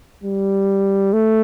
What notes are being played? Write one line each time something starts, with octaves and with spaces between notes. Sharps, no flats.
G3
A3